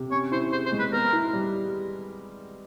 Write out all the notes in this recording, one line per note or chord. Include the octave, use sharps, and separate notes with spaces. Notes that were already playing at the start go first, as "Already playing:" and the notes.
Already playing: C3
C#4 C#5
E4 C5
G#4 C5
C5
G#3
B4
B3 A#4
E4
G3